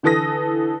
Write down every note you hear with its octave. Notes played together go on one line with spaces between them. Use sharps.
D3 E3 A4 D#6 A#6